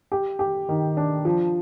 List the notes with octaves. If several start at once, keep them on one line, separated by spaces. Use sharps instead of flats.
G4
G4
D#3
D4
F3